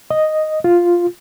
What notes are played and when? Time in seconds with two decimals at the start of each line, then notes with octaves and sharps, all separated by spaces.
0.11 D#5
0.64 F4